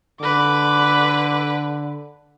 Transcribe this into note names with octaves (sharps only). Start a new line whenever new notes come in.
D3 B4 D6